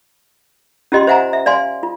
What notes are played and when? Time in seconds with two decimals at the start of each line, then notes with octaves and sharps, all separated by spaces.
0.92 C#4 F4 G4 D#5 G5 C6
1.07 C5 E5 F#5 G#5 A#5
1.33 E5
1.46 D5 F5 G#5 C6
1.83 F4